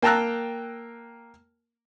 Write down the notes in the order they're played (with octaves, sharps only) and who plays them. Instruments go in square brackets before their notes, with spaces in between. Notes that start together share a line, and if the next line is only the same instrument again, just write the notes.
[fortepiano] A#3 G5 A5 A#5 E6 F#6